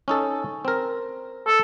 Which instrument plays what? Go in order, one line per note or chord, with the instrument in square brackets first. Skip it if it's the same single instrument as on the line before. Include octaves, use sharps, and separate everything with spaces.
[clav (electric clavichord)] C#4 D#4 A4
C4 A#4
[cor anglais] A4